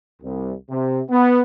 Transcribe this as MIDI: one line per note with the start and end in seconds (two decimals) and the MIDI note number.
0.22 0.52 36
0.70 1.00 48
1.10 1.42 59